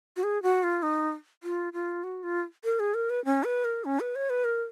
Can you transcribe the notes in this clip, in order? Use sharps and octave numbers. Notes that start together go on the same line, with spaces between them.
F#4
G#4
F#4
F4
D#4
F4
F4
F#4
F4
A#4
G#4
A#4
B4
C#4
B4
A#4
C#4
B4
C#5
B4
A#4